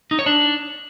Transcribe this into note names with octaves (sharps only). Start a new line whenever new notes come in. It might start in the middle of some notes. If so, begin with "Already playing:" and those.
D#4
C#5
D4